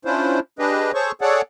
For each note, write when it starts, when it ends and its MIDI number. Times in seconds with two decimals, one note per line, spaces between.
0.05 0.40 61
0.05 0.40 62
0.05 0.40 64
0.05 0.40 65
0.05 0.40 72
0.59 0.92 62
0.59 0.92 67
0.59 0.92 68
0.59 0.92 71
0.59 0.92 75
0.94 1.12 68
0.94 1.12 69
0.94 1.12 72
0.94 1.12 73
0.94 1.12 85
1.21 1.42 68
1.21 1.42 69
1.21 1.42 73
1.21 1.42 74
1.21 1.42 78